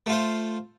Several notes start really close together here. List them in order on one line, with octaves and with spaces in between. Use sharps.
A3 F4 C5